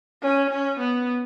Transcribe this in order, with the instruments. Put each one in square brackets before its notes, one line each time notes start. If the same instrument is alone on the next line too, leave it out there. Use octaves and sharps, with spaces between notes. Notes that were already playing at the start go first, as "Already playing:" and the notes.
[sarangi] C#4
C#4
B3